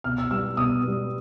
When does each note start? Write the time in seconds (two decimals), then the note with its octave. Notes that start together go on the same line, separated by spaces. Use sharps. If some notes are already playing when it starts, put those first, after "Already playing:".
0.04 B2 F6
0.18 E6
0.31 G3 B3 E6
0.57 B2 D#6
0.84 G3 B3